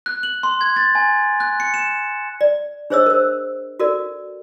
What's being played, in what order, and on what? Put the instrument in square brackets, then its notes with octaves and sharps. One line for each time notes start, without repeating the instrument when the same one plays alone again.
[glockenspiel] F#6
F#7
C6
G#6
A6
G#5
F#6
C#7
E7
[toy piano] D5
D4 G#4 C5 C#5 D#5 E6
A#4 C5
F#4 A4 A#4 D5